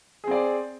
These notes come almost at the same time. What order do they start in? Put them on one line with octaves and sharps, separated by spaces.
G#4 C4 D5